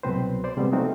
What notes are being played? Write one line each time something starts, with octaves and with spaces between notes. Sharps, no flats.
C2 B2 F#3 C4 B4 C5
C5 D5 C6
C3 G3 G#3 B3 C4
F3 A3 C4 D#4 F4 F#4